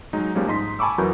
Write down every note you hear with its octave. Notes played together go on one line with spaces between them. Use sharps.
F#3 G#3 D#4
F3 G3 G#3 A#3 C#4 D#4
G#2 D#4 D#5 C6 B6
G#5 A5 B5 C#6 D6 E6
F#2 E3 F#3 F#4 A#4 G6